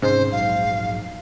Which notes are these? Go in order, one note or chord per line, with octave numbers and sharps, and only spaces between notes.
G#1 G#2 C3 C#4 C5
A#1 F#3 F5